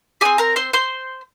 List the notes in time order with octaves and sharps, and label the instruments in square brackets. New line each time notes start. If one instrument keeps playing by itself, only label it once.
[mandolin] C4 G4 G#4 G#5
A#4 A#5
C5 C6
C5 C6